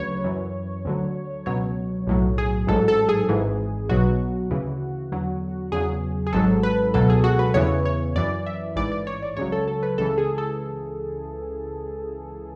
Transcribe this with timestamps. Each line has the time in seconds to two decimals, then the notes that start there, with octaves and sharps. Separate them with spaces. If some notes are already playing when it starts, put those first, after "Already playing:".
Already playing: D2 C#3 F#3 B4 C#5
0.24 F#2 E3
0.85 D2 D3 F#3
1.46 C#2 B2 F#3 C#5
2.07 B1 A2 F#3
2.38 G#4
2.67 A1 G#2 F#3 A4
2.88 A4
3.09 G#4
3.29 G#1 G#2 E3
3.89 B1 B2 F#3 F#4
4.51 D2 C#3 E3
5.12 E2 D3 F#3
5.72 E2 C#3 F#3 G#4
6.27 G#4
6.33 G#1 G#2 F#3 A4
6.63 B4
6.94 C#2 B2 F#3 A4
7.10 G#4
7.24 F#4
7.39 B4
7.54 E2 C#3 E3 C#5
7.85 C#5
8.16 F#2 E3 D5
8.46 E5
8.76 A1 G#2 E3 D5
8.92 D5
9.07 C#5
9.23 D5
9.37 C#2 C#3 F#3 C#5
9.52 A4
9.68 A4
9.83 B4
9.98 C#2 C#3 E3 A4
10.18 G#4
10.38 A4